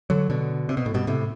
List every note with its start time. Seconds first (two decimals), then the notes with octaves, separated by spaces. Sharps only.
0.10 D3 F#3
0.30 B2 D3
0.69 C3
0.77 B2
0.86 A2
0.94 G2 B2
1.07 A2 C3